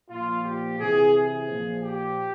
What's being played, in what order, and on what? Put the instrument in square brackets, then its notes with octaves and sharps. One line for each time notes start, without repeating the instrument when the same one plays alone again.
[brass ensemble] A#2 F3 F4
G4
C3 E3 G#4
G#4
A#2 F3
G4